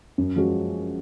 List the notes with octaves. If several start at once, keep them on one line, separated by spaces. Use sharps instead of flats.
F#2
F3 G#3 C#4 F#4